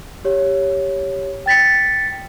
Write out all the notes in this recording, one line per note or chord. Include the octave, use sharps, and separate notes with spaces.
G4 C#5
G5 A6 B6 C#7